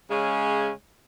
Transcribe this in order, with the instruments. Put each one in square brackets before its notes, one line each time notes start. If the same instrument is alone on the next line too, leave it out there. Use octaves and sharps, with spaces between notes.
[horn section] C#3 G#3 C#4